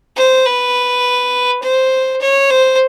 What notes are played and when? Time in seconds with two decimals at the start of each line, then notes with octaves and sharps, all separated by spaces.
0.16 C5
0.45 B4
1.62 C5
2.21 C#5
2.50 C5